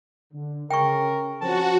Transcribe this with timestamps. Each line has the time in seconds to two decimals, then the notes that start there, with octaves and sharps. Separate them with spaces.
0.33 D3
0.70 C#3 A#4 G5 C#6
1.41 F3 C4 C#4 F#4 A5